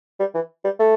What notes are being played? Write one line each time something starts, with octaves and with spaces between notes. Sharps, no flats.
G3
E3
G3
A3